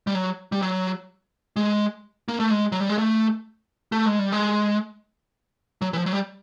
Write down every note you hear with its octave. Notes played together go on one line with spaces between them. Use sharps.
G3
F#3
G3
F#3
G#3
A#3
A3
G#3
F#3
G3
G#3
A3
A3
G#3
G3
G#3
F#3
E3
F3
F#3
G3